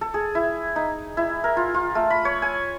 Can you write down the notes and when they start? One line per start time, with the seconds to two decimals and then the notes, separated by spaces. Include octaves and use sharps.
0.01 A4
0.14 G#4
0.35 E4
0.76 D#4
1.17 E4
1.44 A#4
1.57 F4
1.74 F4
1.95 A3
2.10 B5
2.25 C#5
2.42 G#5